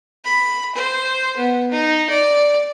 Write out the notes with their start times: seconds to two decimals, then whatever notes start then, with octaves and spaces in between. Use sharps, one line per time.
0.25 B5
0.75 C5
1.37 B3
1.71 D#4
2.10 D5